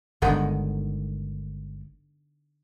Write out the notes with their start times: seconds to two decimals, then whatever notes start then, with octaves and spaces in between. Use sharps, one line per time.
0.22 G1 D3 D#3 G#3 B3 D#4